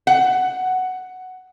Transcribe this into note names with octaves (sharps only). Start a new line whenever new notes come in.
F#5